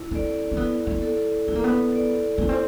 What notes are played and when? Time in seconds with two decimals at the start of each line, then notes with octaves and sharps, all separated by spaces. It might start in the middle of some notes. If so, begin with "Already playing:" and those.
Already playing: E4
0.11 C4 A4 D5
0.51 C4
0.57 B3 E4
0.87 B3
1.02 A4 D5
1.48 B3 E4
1.55 A#3
1.64 B3
1.93 A4 D5
2.38 B3 E4
2.49 C4